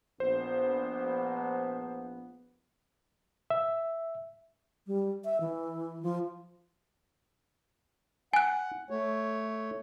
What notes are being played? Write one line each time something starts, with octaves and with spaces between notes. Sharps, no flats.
A#1 B3 C5
E5
G3
E5
E3
F3
F#5 G#5 F#6
A3 C#5